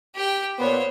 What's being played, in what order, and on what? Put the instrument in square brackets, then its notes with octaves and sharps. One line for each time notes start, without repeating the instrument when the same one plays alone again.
[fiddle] G4 G5
[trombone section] A#2 B3 [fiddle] C5 C#5